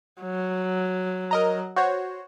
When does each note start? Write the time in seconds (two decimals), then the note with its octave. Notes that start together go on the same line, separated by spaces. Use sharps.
0.21 F#3
1.31 A#4 D#5 A#5
1.76 F#4 C5 C#5